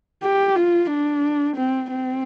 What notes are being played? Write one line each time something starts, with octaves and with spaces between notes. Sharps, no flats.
G4
F4
D4
C4
C4